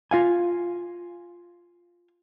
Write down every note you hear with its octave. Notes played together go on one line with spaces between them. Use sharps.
F4 F5 G#5